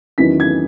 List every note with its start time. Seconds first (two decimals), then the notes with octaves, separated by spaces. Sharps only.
0.18 E2 D#3 F#3 C#4 E4 B6
0.40 G#6